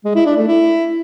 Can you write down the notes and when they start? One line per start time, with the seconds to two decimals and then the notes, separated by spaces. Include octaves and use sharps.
0.04 G#3
0.15 E4
0.26 D4
0.37 A3
0.47 E4